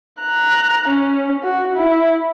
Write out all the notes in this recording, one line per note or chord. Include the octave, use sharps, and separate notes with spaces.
A#5 F#6
C#4
F#4
E4